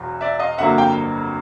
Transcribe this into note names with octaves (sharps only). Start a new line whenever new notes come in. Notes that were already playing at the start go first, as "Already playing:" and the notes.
Already playing: E1 E2 F#3
D5 E5
D#5 F5
G1 F2 D3 F#3 A#3 E5 F#5
F5 G5